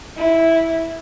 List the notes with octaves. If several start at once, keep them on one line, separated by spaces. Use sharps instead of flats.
E4